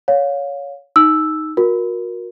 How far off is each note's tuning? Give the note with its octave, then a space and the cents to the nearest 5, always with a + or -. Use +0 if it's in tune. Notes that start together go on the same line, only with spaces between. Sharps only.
C#5 +15 F5 +25
D#4 +0 E6 +0
F#4 -30 A#4 +15